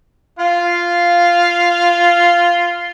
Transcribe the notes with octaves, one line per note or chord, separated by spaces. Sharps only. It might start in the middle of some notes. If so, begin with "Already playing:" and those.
F4 F5